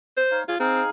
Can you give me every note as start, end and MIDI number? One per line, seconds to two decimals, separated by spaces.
0.17 0.39 72
0.31 0.44 63
0.31 0.44 73
0.31 0.44 77
0.48 0.56 65
0.48 0.56 68
0.48 0.56 73
0.60 0.82 60
0.60 0.90 63
0.60 0.90 68
0.60 0.90 77